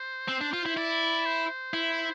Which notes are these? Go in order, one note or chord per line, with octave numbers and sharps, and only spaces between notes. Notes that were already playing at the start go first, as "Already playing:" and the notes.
Already playing: C5
C4
D4
F4
E4
E4 D5
C5
E4